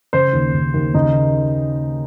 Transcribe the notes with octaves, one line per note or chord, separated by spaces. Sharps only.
C#3 C5
D#2
C#3
D#2
C#3 D#4